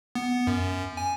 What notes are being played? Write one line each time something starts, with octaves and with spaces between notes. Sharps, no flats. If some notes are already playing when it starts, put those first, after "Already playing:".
B3
F#2
G#5